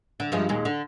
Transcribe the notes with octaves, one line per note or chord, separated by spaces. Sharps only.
D3
G2 F3 G#3
D#2 A#2 G#3
D3